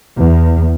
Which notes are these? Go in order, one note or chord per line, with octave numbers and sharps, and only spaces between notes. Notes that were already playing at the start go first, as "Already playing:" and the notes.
E2